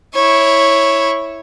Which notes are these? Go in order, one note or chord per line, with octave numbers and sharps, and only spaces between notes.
E4 C#5